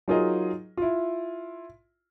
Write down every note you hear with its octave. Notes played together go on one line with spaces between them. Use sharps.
F#3 D#4 F4 G#4 A#4 D#5
E4 F4